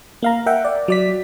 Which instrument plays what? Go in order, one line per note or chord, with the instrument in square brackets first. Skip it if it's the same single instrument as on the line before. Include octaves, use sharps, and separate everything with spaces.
[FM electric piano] A#3 F5 A#5
A#4 E5 F#5 G5
D5
F#3 D5 B6